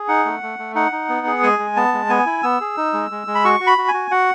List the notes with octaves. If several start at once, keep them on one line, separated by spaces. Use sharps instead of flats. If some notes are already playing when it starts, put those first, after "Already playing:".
Already playing: G#4
D#4 F#5
A3
A3
A3
D#4 F#5
D#4
B3
G#4
G#3 G#5
G#3
B3 A5
G#3
B3 G#5
E4
B3 E6
G#4
D#4
G#3
G#3
G#3
B5
F#4 C#6
F#4
B5
F#4
G#5
F#4
F#4 F#5